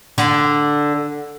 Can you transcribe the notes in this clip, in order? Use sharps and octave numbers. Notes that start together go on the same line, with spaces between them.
D3